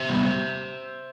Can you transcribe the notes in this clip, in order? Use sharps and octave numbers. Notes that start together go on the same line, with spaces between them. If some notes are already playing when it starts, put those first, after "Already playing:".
Already playing: C5 E5
C3 G3 B3